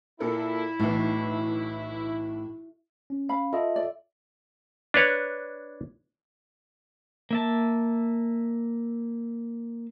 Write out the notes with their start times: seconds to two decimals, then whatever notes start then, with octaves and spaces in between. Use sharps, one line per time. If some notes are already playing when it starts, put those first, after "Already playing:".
0.20 A#2 E4 A4 A#4
0.80 B1 A2 E3
3.10 C#4
3.29 F5 B5
3.53 F4 A4 D#5 E5
3.76 D5
4.94 D4 B4 C#5
7.31 A#3 E5 A5